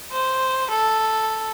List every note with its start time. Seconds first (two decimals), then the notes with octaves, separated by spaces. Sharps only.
0.12 C5
0.71 A4